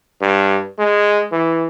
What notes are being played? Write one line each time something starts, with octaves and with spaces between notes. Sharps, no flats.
G2
G#3
E3